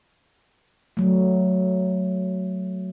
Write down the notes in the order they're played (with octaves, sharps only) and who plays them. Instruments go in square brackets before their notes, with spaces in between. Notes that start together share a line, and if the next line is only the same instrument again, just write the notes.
[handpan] F#3 A3